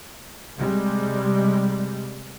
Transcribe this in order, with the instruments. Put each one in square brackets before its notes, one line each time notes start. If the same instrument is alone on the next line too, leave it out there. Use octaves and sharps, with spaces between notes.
[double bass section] C3 G3 G#3